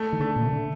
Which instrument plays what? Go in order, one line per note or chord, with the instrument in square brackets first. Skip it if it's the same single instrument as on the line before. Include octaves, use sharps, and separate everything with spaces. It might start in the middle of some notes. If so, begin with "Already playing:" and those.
Already playing: [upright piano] A3
[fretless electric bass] D#3
[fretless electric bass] D3 [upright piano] A3
[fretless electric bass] A#2
C3
D3